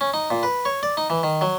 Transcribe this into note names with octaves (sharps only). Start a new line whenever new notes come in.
C#4
D#4
A#2
B4
C#5
D5
D#4
E3
D#3
F#3